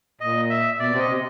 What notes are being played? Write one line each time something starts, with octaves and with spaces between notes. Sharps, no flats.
A#2 D#5
E5
B2 D5
C3
D#5
C3